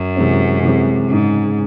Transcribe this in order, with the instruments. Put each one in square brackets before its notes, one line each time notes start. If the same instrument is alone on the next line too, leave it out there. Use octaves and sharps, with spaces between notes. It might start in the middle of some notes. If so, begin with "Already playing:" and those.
Already playing: [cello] F#2
[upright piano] C3 E3 G#3 C4
C3 E3 G#3 C4
[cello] G#2 [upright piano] C#3 G#3 D#4